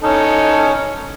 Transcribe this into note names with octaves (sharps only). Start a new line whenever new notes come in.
C#4 D#4 A4